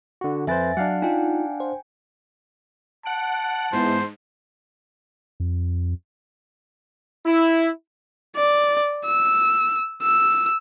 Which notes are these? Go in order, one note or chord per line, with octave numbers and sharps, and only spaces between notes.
D3 F#4
F2 B4 C5 E5 G#5 A6
F#3 D4 F5 F#5
D#4 F4 G5 G#5
C5
F#5 A5 F#6 D7
G#2 E3 B3 C5
F2
E4
D5
E6
E6